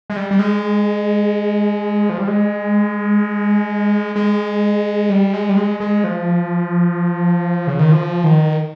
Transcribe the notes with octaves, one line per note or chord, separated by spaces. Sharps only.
G#3
G3
G3
G#3
F3
G3
G#3
G#3
G3
G#3
G3
G#3
G#3
F3
C#3
D#3
F3
D#3